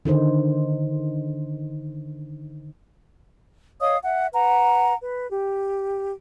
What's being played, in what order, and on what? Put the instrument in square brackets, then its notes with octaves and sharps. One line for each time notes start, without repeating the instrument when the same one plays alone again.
[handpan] D3 D#3 D#4 C5
[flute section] C#5 D#5 F5 D#6
E5 F#5
B4 F#5 A#5
B4
G4